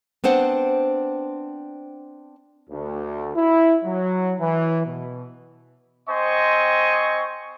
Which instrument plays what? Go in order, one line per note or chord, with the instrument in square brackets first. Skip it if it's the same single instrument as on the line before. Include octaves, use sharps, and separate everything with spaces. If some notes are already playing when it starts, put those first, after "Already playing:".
[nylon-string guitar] B3 C4 D4 C5 F#5
[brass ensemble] D2
E4
F#3
E3
B2
[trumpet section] C4 C5 D#5 G#5 C#6